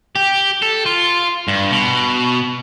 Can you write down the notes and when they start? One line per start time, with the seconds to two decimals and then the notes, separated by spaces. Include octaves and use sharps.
0.16 G4
0.62 A4
0.86 F4
1.48 G2
1.71 B2